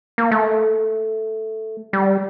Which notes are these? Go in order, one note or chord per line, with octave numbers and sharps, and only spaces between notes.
A#3
A3
G3